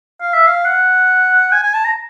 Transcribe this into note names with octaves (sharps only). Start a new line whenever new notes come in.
F5
E5
F5
F#5
G#5
G#5
A5
A#5